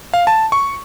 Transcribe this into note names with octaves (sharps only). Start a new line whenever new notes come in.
F5
A5
C#6